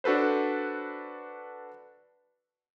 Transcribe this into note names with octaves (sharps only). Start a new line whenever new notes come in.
D4 F#4 A4 B4 C5